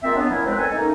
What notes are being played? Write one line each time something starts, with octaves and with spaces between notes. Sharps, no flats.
G#3 A#3 C4 F4 E5
F#3 B3 D4
A#2 E3 F#3 C#4 E4
D#3 F#3 G#3 C4 B4 C5
B2 D#4 A4 G#5
A3 A#3 C#4 D#4